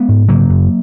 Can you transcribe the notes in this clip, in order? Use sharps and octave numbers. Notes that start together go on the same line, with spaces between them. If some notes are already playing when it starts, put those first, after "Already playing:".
Already playing: G#3 B3
G#2
C#3 F#3 A#3
F#2